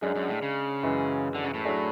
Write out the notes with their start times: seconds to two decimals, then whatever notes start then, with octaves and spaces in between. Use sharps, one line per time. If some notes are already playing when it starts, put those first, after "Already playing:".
0.02 F#2 G#3 D4 G#4
0.16 F#2
0.29 A2
0.42 C#3
0.83 F#2 E3 G#3
1.35 D3
1.44 C#3
1.54 A2
1.65 F#3 A3 D4 G#4